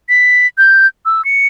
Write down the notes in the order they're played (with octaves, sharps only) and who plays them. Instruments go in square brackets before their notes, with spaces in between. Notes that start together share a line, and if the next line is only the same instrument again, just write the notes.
[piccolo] B6
G6
E6
C#7